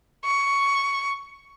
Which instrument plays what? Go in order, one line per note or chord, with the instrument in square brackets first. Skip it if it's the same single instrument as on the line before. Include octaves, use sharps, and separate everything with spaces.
[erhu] C#6